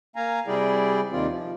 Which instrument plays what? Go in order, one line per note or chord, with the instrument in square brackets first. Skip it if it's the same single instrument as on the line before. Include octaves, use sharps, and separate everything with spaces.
[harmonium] A#3 F5 G#5 A#5
C3 G3 E4 G#4 D5 G5
D#2 C3 D#3 C4 F4 D5
F3